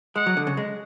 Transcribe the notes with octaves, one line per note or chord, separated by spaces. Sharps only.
G#3 F#5
F#3
D3
C#3
G#3